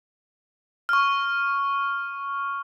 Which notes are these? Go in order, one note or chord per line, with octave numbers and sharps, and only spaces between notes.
C#6 F6